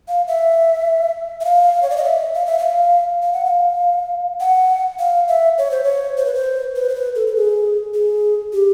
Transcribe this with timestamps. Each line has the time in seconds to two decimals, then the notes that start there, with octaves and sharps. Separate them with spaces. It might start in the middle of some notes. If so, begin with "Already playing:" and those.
0.08 F5
0.28 E5
1.41 E5
1.45 F5
1.83 C#5
1.90 D5
1.97 D#5
2.04 E5
2.34 F5
2.46 E5
2.59 F5
3.23 F5
3.33 F#5
3.45 F5
4.40 F#5
4.99 F5
5.28 E5
5.58 C#5
5.71 C5
5.84 C#5
6.18 C5
6.25 B4
6.34 C5
6.76 B4
6.89 C5
6.95 B4
7.15 A4
7.27 A4
7.36 G#4
7.94 G#4
8.53 G4